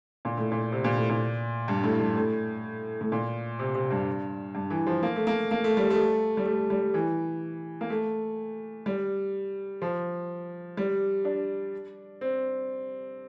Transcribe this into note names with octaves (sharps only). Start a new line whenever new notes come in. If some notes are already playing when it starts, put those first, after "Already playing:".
A#2
A2
A#2
C3
A#2
A2
A#2
G2
A2
G2
A2
A2
A#2
C3
C3
G2
G2
E3
F3
A#3
A3
A#3
A#3
A3
G3
A3
G3
A3
G3
E3
A#3
A3
G3
F3
G3
D4
C4